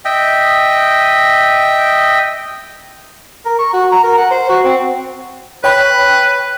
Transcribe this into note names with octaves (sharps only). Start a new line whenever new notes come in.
D#5 E5 G5
A#4
C#6
F#4
A#5
A#4
F#5
C5
F#4
C4
B4 C#5 G5 B5